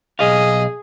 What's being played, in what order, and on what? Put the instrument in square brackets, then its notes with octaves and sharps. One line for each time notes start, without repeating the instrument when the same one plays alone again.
[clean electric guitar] B1 D#5 F5 [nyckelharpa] G#4